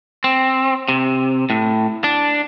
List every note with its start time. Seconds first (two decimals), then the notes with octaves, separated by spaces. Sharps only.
0.24 C4
0.88 C3
1.50 A2
2.04 D4